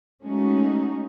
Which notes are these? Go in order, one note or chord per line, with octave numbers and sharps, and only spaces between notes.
G#3 A3 C#4 D#4 F#4